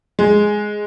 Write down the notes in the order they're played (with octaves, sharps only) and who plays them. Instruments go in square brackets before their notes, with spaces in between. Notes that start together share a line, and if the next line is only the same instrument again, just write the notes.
[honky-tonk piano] G#3